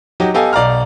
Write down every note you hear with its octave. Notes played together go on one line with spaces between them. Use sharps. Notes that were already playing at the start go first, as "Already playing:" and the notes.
F#3 D#4 F#4 G4
B3 G4 A4 D#5 F5 G#5
B1 D5 F5 A#5 F6